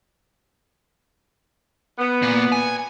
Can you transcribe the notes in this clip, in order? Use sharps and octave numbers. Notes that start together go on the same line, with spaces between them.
B3
A#2
G#5